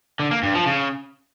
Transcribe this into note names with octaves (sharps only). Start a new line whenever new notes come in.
D3
A#3
G2
F3
C#3